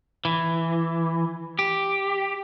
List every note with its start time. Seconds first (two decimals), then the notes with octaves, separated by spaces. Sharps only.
0.25 E3
1.59 G4